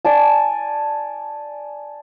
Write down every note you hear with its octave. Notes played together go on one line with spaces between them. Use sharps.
D5 G#5 A5